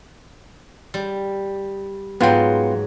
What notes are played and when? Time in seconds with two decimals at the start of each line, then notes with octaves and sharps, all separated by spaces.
0.94 G3
2.21 G#2 F#3 B3 F4 G5